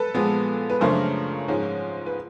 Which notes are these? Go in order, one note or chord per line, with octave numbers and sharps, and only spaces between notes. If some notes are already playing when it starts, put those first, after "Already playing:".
Already playing: A4 B4
A#2 F3 G#3 B3
B4
F#2 C#3 F3 A3 D4 A#4 C5
G#2 F3 G#3 C#4
B4